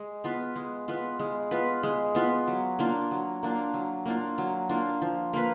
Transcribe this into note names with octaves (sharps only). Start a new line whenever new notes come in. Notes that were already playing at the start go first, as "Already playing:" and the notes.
Already playing: G#3
B3 F4 B4
G#3
B3 F4 B4
G#3
B3 F4 B4
G#3
B3 F4 B4
F#3
A#3 D4 F4
F#3
A#3 D4 F4
F#3
A#3 D4 F4
F#3
A#3 D4 F4
F3
A#3 F4 B4